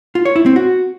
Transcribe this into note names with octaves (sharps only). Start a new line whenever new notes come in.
F4
C#5
E4
C4
F#4